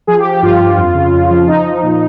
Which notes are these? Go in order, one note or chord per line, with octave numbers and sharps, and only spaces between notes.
F3 G#4
G4
F3
G4
G2 F4
G2
F2
C#3
F2
F3
F3 D#4
F3
A#2